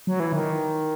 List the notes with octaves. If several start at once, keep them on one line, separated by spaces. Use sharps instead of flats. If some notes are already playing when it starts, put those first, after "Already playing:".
F#3
E3
D#3